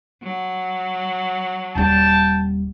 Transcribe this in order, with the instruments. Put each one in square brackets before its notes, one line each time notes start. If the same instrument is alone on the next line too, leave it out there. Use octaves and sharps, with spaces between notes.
[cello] F#3
[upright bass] D#1 G3 [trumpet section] G5 A5